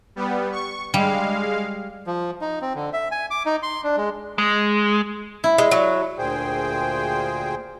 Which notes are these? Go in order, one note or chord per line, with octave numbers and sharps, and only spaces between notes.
G3 B3
C#6
G3 G#3 F5
F3
D#4
C4
D3
E5
G#5
D6
D#4
C6
D4
G#3
G#3
E4
G#3
F#3
D2 A#2 G#4 C5 G5